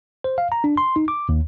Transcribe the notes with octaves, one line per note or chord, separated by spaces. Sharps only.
C5
F5
A#5
D4
C6
D#4
D6
D#2